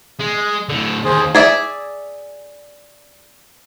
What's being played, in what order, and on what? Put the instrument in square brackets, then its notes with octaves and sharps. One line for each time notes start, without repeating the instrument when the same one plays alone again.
[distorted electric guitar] G#3
A2 D3
[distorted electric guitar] D#2 [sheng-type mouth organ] G#4 C5
[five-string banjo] G#4 D5 E5